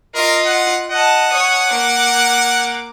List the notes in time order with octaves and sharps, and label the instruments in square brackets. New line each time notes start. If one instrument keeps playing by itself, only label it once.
[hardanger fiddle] F4 D#5 [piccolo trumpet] A#4
[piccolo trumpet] F#5
[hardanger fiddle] D#5 A5 [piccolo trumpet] F#5
[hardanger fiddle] C#5 D#6
A#3 D6